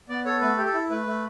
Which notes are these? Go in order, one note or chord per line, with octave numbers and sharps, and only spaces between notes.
B3 D5
A4 C#5
A3 B4
G4
A4
E4
A3 B4
A3